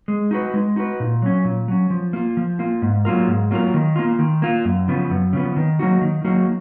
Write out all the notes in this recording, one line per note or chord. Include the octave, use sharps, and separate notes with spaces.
G#3
D#4 F#4 B4
G#3
D#4 F#4 B4
A#2
F#3 C#4
A#2
F#3 C#4
F3
A#3 F4
F3
A#3 F4
G#2
F#3 A#3 F4 A#4
G#2
F#3 A#3 F4 A#4
D#3
A#3 F4
D#3
A#3 F4
F#2
C#3 F3 B3
F#2
C#3 F3 B3
D#3
F#3 A#3 D#4 F#4
D#3
F#3 A#3 D#4 F#4